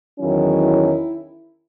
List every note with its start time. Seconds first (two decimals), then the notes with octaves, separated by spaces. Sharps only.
0.18 E2 D#3 F#3 C#4 E4